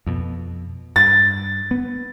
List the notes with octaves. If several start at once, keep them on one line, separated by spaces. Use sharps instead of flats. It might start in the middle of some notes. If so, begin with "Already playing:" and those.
F2 B2
G2 A6
B3